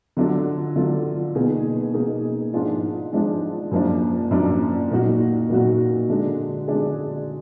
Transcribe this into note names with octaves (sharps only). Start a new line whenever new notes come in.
D3 F#3 D4 F4
D3 F#3 D4 F4
B2 A#3 D#4 G#4
B2 A#3 D#4 G#4
G#2 F3 G#3 D4 F4
G#2 F3 G#3 D4 F4
F#2 F3 A#3 D4
F#2 F3 A#3 D4
A#2 F#3 A#3 D#4 F#4
A#2 F#3 A#3 D#4 F#4
D3 G#3 D4 G#4
D3 G#3 D4 G#4